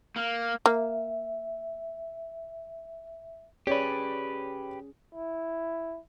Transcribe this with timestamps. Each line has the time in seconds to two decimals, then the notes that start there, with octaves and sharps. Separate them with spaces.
0.16 A#3
0.66 A#3 E5
3.67 C#4 G4 G#4 B4 C#5 D5
5.15 E4